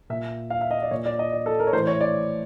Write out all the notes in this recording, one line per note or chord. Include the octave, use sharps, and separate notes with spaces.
A#2 E5
F5
E5
D#5
D5
A#2 C#5
D5
D#5
D5
A4
A#4
C#5
A2 E3 C5
C#5
D5